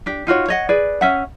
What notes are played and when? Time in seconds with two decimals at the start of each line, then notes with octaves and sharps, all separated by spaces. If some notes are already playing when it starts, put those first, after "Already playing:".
0.06 D4 G4
0.27 D#4 F4 F#4 C#5
0.48 C#5 D#5 F#5
0.69 G#4 B4 D5
1.01 C#4 E5 F#5